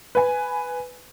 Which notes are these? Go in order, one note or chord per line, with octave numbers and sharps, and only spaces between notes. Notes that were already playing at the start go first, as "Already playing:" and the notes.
B4 G#5